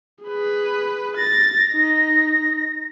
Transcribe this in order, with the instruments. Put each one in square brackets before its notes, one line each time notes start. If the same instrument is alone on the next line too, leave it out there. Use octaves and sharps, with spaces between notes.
[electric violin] G#4 B4
[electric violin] A6 [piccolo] A#6
[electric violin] D#4